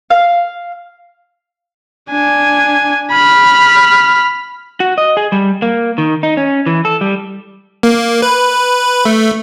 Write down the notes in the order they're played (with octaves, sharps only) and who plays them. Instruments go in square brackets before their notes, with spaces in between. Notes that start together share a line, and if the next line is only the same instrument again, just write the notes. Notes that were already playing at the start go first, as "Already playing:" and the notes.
[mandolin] F5
[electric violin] D4 G#5
B5 F6
[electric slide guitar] F#4
D#5
G#4
G3
A#3
D#3
D#4
C#4
E3
A4
G3
[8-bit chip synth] A#3
B4
A3